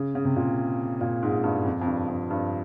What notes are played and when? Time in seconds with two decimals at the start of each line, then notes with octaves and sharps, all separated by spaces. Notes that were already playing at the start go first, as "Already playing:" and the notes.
Already playing: C#3
0.15 C#3
0.25 C3
0.36 A#2
1.01 A#2
1.22 G#2
1.44 G2
1.65 F2
1.81 F2
1.86 G2
2.08 F2
2.30 G2